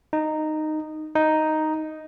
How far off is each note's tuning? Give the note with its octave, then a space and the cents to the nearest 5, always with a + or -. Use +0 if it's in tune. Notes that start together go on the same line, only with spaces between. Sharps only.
D#4 -10
D#4 +0